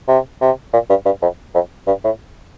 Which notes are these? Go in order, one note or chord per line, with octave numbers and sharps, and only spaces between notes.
C3
C3
A#2
G2
G2
F2
F2
G2
A2